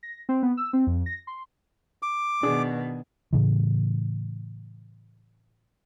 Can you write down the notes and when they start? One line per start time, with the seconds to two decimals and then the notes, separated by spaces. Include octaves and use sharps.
0.03 A#6
0.29 C4
0.43 B3
0.57 E6
0.73 C4
0.87 F2
1.06 A#6
1.27 C6
2.03 D6
2.43 B2 D#3 D4 G#4
3.33 A2 C#3 E3